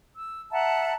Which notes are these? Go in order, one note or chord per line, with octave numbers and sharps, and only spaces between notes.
E6
E5 F#5 A5 A#5